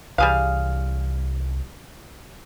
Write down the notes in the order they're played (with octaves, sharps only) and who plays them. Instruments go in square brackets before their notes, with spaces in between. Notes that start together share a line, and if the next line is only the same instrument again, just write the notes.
[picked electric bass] C2 E3 [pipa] G3 G#4 F5